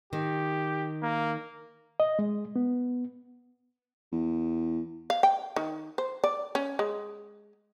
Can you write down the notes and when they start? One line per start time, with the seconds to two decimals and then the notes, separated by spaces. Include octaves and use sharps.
0.13 D#3 G4
1.02 A#3
2.00 D#5
2.19 G#3
2.56 B3
4.12 E2
5.10 F5
5.23 G5
5.56 D#3
5.98 C5
6.24 D5
6.55 C#4
6.79 G#3